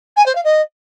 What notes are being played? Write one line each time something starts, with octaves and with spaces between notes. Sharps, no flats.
G#5
C5
F5
D#5